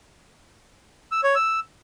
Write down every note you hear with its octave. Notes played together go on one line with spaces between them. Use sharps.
E6
C#5
E6